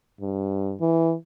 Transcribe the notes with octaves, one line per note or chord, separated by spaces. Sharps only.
G2
E3